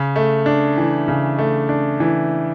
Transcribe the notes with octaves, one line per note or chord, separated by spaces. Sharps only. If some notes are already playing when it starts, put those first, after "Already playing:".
Already playing: C#3
A3
D4
E3
C#3
A3
D4
E3